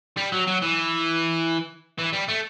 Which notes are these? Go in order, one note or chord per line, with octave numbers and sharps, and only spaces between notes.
G3
F#3
F#3
E3
E3
G3
A3